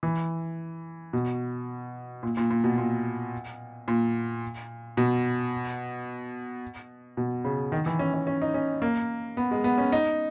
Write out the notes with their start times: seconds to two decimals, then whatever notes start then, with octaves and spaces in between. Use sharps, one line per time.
0.03 E3
1.13 B2
2.23 A#2
2.37 A#2
2.50 A#2
2.64 B2
2.78 A#2
3.88 A#2
4.97 B2
7.17 B2
7.45 C#3
7.72 D#3
7.86 E3
7.99 C#4
8.14 C#4
8.27 C#4
8.42 D#4
8.54 C#4
8.82 A#3
9.37 B3
9.51 G#3
9.64 B3
9.78 C#4
9.92 D#4